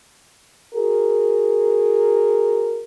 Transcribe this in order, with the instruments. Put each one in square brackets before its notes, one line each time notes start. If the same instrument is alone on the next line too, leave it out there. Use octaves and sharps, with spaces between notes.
[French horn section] F#4 G#4 A#4